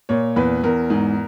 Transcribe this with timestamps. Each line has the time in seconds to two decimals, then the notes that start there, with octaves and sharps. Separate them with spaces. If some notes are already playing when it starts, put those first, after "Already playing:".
0.09 A#2 C#5
0.36 E2 B4
0.64 E2 A#4
0.90 G#2